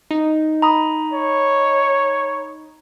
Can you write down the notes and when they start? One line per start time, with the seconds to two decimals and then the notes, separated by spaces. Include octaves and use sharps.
0.11 D#4
0.62 A#5 B5 D#6
1.13 C#5